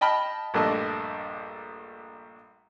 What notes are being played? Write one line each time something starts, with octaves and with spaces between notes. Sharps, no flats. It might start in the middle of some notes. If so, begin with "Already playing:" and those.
D#5 G5 A5 B5 F6
A#1 G2 A3 D4 D#5 A5